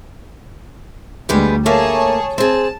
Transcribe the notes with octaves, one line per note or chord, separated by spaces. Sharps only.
D2 G3 G#3 B3 G4
A3 A#3 G#4 C#5 F5 A5
C4 G#4 A5